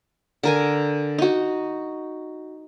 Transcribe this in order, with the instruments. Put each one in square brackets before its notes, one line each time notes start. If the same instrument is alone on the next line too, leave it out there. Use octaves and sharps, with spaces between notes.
[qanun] D3 A#4 G#5
D#4 F#4